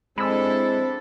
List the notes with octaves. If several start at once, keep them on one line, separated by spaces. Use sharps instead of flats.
G#3 C4 D4 E4 A4 B5 E6